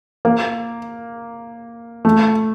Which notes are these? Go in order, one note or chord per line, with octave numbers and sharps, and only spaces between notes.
A#3
A3